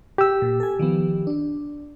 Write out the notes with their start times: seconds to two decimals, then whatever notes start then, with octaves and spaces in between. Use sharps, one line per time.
0.18 G4 E6
0.42 A#2
0.60 A4 G#5
0.79 D#3 F3 B3
1.27 D4